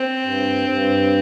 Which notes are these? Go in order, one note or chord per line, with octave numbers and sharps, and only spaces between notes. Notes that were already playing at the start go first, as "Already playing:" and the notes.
Already playing: C4
G2
G2